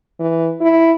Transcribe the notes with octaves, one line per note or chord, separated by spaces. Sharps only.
E3
E4